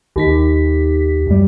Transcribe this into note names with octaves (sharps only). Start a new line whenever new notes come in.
D#2 D#4 G4 B6
F#2 G3